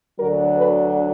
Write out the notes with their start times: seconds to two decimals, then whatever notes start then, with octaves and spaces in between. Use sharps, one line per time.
0.19 D2 D3 F#3 D4 A#4
0.57 B4